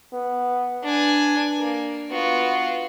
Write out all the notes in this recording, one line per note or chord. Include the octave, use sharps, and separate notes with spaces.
B3
D4 B4 G#5
A#3
B3 F4 F#4